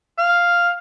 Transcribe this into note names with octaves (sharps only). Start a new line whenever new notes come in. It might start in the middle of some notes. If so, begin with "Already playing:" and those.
F5